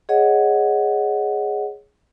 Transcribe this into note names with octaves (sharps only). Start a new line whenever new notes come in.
G#4 C#5 D#5 F#5